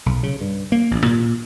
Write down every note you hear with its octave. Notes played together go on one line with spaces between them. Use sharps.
B1
C#3
G2
A#3
A1
A#2